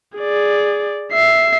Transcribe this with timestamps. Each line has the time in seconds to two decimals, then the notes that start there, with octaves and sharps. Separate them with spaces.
0.18 G#4 D5
1.12 E5 C7